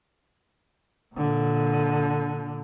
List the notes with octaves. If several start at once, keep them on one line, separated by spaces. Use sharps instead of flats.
A#2 D3